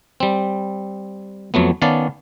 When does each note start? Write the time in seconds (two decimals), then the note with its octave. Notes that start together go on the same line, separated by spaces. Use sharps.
0.20 G3 C4
1.54 F2 F#3 A3 B3
1.82 D#3 B3 C#4 D5 F5 A5